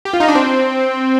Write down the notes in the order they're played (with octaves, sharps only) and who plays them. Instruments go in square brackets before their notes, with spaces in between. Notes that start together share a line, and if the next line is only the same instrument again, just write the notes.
[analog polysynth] G4
F4
D#4
D4
C4